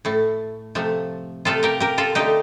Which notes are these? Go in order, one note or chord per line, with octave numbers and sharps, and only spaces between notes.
A2 A3
C3 F3 A3
C3 F3 A3 F4 A4
G4 A#4
G4 A#4
F4 A4
D3 A3 D#4 G4